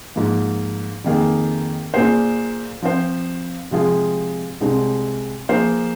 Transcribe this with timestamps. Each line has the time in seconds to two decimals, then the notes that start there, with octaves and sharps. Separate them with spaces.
0.16 G#2 F3 A#3
1.04 F2 D#3 A#3 G#4
1.94 A#2 A#3 G#4 C5
2.82 F3 C4 F4 C5
3.71 C3 F3 G#3 F4 G#4
4.60 C2 C3 G#3 C4
5.49 F3 A#3 G#4 C5